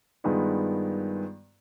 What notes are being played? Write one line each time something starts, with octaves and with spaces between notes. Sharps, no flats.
G2 D#3 G#3 B3 F4